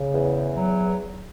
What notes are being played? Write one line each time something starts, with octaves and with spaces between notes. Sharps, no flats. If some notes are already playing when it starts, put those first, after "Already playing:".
Already playing: C#3
E2
F#3